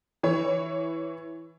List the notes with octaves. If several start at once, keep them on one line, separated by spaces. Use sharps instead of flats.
E3 C#5